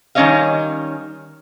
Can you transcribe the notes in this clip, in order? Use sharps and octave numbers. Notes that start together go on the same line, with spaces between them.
D#3 G3 C#4 C#5 D#5 F5